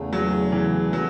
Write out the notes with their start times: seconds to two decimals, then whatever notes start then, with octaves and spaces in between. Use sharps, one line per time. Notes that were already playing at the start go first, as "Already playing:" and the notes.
Already playing: E2 C#3 A3
0.13 F#3
0.52 E3
0.93 B2 F#3 A3 C#4